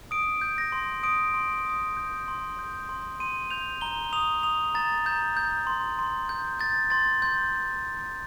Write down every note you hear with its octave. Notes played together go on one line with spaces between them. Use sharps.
D#6 D7
G6
A#6
C6
D#6 D7
C6
D#6
G6
C6
G6
C6
C6 D#7
G6 F7
A#5 G7
D#6 F7
D#6 F7
A#5 A6
A#5 G6
G6
C6
C6
G6
G6 A6
C6 A6
C6 G6